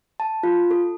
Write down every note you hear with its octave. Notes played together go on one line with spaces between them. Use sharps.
A5
F4
A4